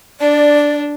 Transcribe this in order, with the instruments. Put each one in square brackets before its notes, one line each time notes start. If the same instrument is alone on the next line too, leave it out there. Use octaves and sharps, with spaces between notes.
[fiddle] D4 [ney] D5